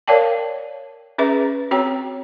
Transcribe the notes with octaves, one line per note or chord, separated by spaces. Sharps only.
A#4 C#5 D5 F5 G5 A5
C#4 G#4 B4 E5 A#5
C4 F#4 C#5 G5 A#5